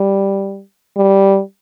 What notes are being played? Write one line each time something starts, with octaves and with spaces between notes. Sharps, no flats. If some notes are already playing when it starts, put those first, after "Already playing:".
Already playing: G3
G3